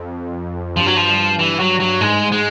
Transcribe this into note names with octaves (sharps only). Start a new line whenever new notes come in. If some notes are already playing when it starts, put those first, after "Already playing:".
Already playing: F2
G2 F3
F#3
F3
E3
F#3
F#3
G#2 G#3
G#3